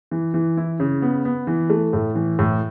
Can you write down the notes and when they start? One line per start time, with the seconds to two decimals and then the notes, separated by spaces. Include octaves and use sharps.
0.11 E3
0.34 E3
0.57 E4
0.80 C#3
1.02 B3
1.25 B3
1.47 E3
1.70 A3
1.93 A2
2.15 E3
2.39 A2